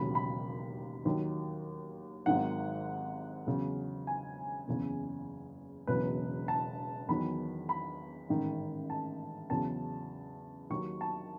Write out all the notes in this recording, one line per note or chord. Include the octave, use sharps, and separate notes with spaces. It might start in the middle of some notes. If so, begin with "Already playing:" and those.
Already playing: E1 D#2 C#3 F#3 B5
B5
D#2 D#3 F#3
G#1 G#2 D#3 F#3 F#5
E2 C#3 F#3
G#5
F#1 E2 C#3
E1 E2 C#3 F#3 B4
A5
E2 D#3 F#3 B5
B5
A1 G#2 D#3
A5
E2 C#3 F#3 A5
D#2 D#3 F#3 C#6
A5